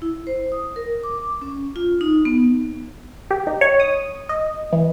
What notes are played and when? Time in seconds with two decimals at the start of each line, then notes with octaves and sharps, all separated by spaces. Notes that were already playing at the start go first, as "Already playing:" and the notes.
0.02 E4
0.27 C5
0.52 D#6
0.76 A#4
1.04 D6
1.42 C#4
1.76 F4
2.01 D#4
2.25 B3
3.31 G4
3.47 D#4
3.61 C#5
3.80 D#6
4.29 D#5
4.73 E3